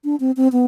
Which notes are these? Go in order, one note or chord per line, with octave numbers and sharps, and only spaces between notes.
D4
C4
C4
B3